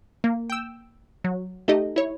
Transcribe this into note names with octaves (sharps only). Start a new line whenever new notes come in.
A#3
G5 E6
F#3
A3 D#4 G4 D#5
E4 C#5